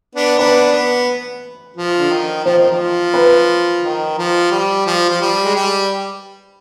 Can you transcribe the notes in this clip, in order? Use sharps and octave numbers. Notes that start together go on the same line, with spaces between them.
B3 D4
B3 D4 B4
B3
F3
D3
D#3
F3 C5
D#3
F3
B4
D#3
F3
G3
F3
F3
G3
G#3
G3